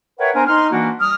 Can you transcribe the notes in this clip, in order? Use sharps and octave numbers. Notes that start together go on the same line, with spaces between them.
A#4 B4 C#5 E5 F#5 G5
B3 D4 A#4 C5 G#5 A#5
D#4 C6 F6
E3 A#3 D4 F#4
G3 D#6 F6